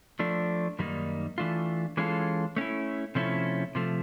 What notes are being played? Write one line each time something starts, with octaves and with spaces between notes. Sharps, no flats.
F3 A3 D4
F#2 D#3 G3 A#3 D#4
E3 A3 D4 F4
E3 G#3 C#4 F4 A4
A3 C#4 E4
C3 F3 A3 C#4 E4
C3 F3 A3